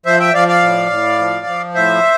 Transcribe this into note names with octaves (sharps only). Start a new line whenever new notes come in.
F3 C5 E5
E5 G5
F3 D5 F5
D5 F5
A2
A2
F3
F3
A2 C5 E5